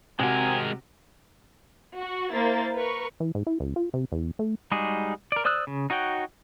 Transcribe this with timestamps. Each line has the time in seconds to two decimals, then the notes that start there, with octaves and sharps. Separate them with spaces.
0.19 C3 G#3 C4 F#4 A#4 G#5
1.97 F#4 C#6
2.33 A#3 E4 A#4 C5 A6
2.76 A#4 B4 C#6
3.20 E3
3.35 G#2
3.47 E4
3.60 C#2
3.76 F4
3.94 C3
4.12 E2
4.39 A3
4.71 G3 G#3 D#4 F#4 G#4
5.32 A#4 D5
5.45 C5 D5 D#6 E6 F#6
5.67 C#3
5.90 D#4 F#4 C#5 F#5 G5